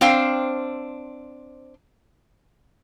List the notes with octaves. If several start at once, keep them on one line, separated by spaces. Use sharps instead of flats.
C4 D4 C5 F5 G5